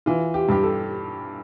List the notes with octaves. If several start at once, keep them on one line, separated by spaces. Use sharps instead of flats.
E3 F4
G4
G2 G4
A4